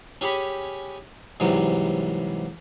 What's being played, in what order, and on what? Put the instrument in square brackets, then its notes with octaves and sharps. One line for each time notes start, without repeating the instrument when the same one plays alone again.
[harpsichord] C#4 G4 G#4 C#5 B5
G#2 C3 E3 F#3 G3